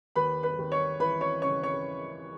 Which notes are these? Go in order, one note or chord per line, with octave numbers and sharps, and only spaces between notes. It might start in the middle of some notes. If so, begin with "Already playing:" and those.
D#2 B4 B5
B4 B5
D#2
C#5 C#6
E3 B4 B5
C#5 C#6
C#3 C#5 C#6
C#5 C#6